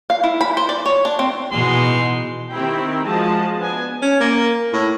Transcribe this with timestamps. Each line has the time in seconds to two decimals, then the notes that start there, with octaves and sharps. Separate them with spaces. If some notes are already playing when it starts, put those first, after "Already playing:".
0.10 F5
0.24 E4
0.41 B5
0.57 C5
0.69 D5
0.86 C#5
1.05 D4
1.19 C4
1.52 B2 E3 G#3 D#4 C6
2.51 D#3 C4 E4 G4 G5
3.05 F3 G#3 F#4 D#5 A5
3.58 B3 D4 G#5
4.02 C#4
4.21 A#3
4.73 A2